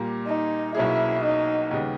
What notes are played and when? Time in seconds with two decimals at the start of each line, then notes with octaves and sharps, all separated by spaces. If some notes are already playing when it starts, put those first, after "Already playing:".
Already playing: A#2 G3 A#3
0.27 D#4
0.75 B1 B2 A#3 C#4 E4 G#4
1.23 D#4
1.71 D#2 C#3 G3 B3